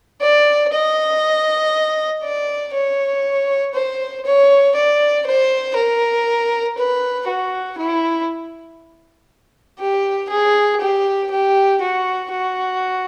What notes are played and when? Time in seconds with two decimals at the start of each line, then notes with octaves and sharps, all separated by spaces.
0.21 D5
0.73 D#5
2.23 D5
2.73 C#5
3.74 C5
4.25 C#5
4.75 D5
5.26 C5
5.75 A#4
6.77 B4
7.27 F#4
7.78 E4
9.79 G4
10.29 G#4
10.81 G4
11.31 G4
11.81 F#4
12.31 F#4